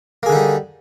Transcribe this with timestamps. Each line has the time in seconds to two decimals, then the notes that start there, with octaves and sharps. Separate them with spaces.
0.23 A#3
0.26 G#4
0.29 D3
0.32 D#4
0.35 G3